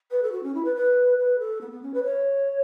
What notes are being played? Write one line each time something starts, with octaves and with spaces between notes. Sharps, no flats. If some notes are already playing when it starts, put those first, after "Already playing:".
B4
A4
F#4
C#4
E4
B4
B4
B4
A4
B3
B3
C#4
B4
C#5